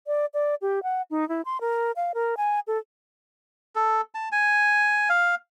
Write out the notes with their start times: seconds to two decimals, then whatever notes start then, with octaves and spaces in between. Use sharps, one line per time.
0.07 D5
0.34 D5
0.62 G4
0.83 F#5
1.10 D#4
1.29 E4
1.45 C6
1.61 A#4
1.96 F5
2.14 A#4
2.37 G#5
2.67 A4
3.76 A4
4.15 A5
4.32 G#5
5.09 F5